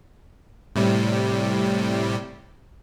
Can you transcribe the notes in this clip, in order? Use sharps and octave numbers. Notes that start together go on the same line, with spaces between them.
A2 C3 G3